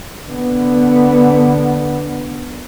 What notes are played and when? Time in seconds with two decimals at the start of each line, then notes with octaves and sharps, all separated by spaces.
0.27 D3 B3